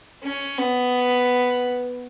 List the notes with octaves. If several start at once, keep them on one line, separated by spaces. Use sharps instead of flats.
C#4
B3